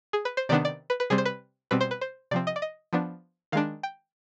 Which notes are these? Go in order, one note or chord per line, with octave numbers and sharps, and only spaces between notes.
G#4
B4
C5
C3 D#3 B3 D4 D5
D5
B4
B4
C3 G3 C4 G#4
C5
B4
B2 G3 C4 B4
C5
B4
C5
C3 F3 C4 D5
D#5
D5
D#5
F3 B3 D4
D#3 G#3 D4 F5
G5